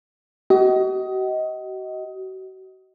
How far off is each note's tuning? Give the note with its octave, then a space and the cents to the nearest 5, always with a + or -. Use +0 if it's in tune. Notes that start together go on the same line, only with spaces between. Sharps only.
F#4 +40 D#5 +20